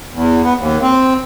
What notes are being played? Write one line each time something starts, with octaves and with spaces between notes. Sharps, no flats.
E2
B3
D#2
C4